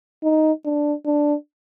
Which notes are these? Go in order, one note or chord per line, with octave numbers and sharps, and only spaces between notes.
D#4
D4
D4